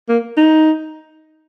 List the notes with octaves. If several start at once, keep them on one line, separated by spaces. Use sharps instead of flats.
A#3
D#4